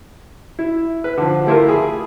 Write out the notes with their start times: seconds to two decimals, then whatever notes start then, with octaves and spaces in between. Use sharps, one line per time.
0.59 E4
1.04 B4
1.17 D3 F3
1.47 A3 E4 F4 G4 A#4
1.69 G#4 B5